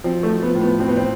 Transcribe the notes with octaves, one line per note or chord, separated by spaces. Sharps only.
F3 C4
A3
F3
B3
A2
B3
F3 C4
B3
C4